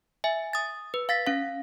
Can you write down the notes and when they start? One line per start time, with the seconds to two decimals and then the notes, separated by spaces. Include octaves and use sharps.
0.24 E5 G#5
0.53 D#6 A6
0.94 B4
1.09 F5 A6 B6
1.27 C#4 F5